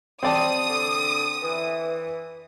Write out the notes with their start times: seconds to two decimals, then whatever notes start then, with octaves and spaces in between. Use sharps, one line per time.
0.23 G3 C4 D5 A5 D#6
0.68 D3
1.42 E3